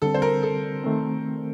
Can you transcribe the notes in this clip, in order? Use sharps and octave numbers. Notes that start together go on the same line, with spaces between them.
D3 G3 C4 A4
C5
A#4
A4
D#3 A3 C4